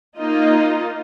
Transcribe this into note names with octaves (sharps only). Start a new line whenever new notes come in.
A#3 D#4 F4 D#5